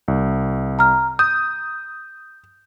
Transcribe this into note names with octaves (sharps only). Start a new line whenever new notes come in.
C2
A#5 F6
D#6 G6